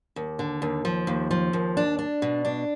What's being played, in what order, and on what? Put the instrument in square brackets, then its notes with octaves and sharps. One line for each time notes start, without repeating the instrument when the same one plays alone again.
[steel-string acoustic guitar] D#2
D3
D#2
F3
D#2
F3
D#2
D4
D4
B2
D4